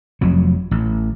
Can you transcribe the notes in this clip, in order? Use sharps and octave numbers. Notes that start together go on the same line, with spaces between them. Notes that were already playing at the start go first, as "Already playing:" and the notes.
F1 F2 F#3
A1